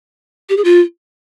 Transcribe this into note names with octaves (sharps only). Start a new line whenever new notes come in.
G4
G#4
F4